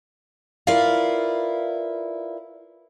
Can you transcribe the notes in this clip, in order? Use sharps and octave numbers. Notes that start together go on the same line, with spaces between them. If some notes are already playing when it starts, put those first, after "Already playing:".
E4 F4 A#4 B4 D5 F5